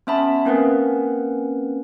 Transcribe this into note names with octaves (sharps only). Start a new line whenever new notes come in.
B3 C#4 E5 A5 B5
A#3 C4 C#4 A#4 B4 F#5